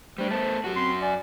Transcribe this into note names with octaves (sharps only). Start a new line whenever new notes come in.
G3 A3 D4 C5
A3 B3 C5 A5
F#2 F#4 G4
C4 C6
D5 G#5